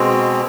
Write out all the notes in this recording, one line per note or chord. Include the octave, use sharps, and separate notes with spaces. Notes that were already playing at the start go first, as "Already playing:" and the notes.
Already playing: B2 G#3 C4